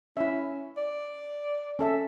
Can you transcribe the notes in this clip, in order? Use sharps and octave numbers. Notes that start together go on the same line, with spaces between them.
C#4 E4 E5
D5
C#4 A4 E5